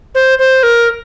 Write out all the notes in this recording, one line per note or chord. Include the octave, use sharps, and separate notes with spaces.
C5
C5
A#4